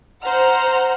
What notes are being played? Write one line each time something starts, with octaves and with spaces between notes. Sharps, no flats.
C5 F#5 A#5 F6